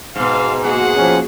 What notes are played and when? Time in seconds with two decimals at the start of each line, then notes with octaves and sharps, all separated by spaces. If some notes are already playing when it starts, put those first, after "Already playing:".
0.16 G#2 B2 F5
0.63 A#3 F#4 G#4 F#5
0.97 F3 C#4